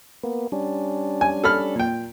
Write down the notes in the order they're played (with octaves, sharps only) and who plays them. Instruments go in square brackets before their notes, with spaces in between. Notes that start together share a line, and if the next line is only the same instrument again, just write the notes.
[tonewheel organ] A#3 B3
G3 C#4 D4
[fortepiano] G#5
A4 B5 F6
A#2 G5